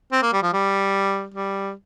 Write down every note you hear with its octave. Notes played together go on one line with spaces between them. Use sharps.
C4
A#3
G3
F3
G3
G3